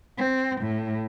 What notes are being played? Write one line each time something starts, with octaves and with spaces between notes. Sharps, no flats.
C4
A2